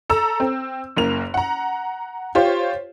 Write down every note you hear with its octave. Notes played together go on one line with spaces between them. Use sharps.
A4 A#5 E6
C4
F#1 A#3 F7
F#5 A#5
F4 G4 C5 C#5